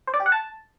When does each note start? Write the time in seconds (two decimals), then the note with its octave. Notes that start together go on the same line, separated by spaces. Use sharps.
0.07 C5
0.14 D5
0.20 G4
0.26 F#5
0.32 A5